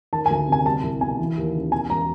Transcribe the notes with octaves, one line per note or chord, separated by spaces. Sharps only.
D#3 A5
G#5
D2
C3 G#5
G3 A5
C2
B2 G#5
E3
D#2
C#3
B2 G#5
E1 A#5